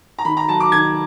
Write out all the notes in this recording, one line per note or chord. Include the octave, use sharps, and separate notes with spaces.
A#5
D#3 B5
A#5
F#3 A5
D6
D#3 G#6